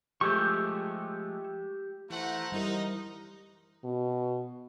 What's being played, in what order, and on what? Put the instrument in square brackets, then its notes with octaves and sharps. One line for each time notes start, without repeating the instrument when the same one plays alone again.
[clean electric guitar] F3 G#3 A3 [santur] G4 [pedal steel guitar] C#6 E6 G6
[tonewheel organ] E3 [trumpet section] A3 F#5 [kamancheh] C5 A#5
[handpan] G3 E4 A#4 [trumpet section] D#4
[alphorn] B2